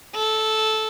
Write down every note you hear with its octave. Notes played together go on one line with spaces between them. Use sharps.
A4